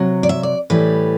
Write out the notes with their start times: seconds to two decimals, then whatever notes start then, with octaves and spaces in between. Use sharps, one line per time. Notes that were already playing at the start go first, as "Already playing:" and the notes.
Already playing: C3 F#3
0.23 D5
0.29 E5
0.43 D5
0.70 A2 E3 G3 B4